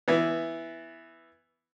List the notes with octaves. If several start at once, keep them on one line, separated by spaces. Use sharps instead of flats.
E3 B3